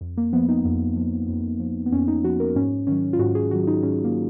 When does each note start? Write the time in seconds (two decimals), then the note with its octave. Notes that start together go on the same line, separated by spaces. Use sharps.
0.01 F2
0.17 A#3
0.33 F3 B3
0.49 D#4
0.65 F2
0.96 F3
1.28 F2
1.60 F3
1.86 B3
1.92 F2 C#4
2.08 D#4
2.24 F3 F#4
2.40 A#4
2.55 G#2 C#4
2.87 D#3 F#3 C#4
3.13 F4
3.19 G#2 F#4
3.35 G#4
3.51 D#3 F#3 F#4
3.67 D#4
3.83 G#2 C#4
4.04 A#3